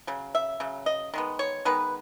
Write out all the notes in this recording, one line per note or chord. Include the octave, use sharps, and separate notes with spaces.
C#3 F#3
E5
C#3 F#3
D#5
D#3 G#3 B3
C#5
D#3 G#3 B3 B4